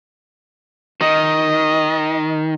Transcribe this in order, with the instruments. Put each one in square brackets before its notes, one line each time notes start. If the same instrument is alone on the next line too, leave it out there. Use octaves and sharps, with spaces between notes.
[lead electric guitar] D#3 [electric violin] D#5